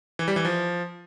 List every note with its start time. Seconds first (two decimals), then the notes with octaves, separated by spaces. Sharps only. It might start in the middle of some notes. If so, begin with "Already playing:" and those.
0.19 E3
0.28 G3
0.36 E3
0.45 F3